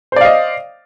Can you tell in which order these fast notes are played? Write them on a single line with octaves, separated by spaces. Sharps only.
C5 D5 F5 D#5